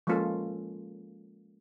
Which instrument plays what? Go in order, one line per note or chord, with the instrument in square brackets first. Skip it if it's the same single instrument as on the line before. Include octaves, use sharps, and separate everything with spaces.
[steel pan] F3 G#3 A#3 C#4 F4 A4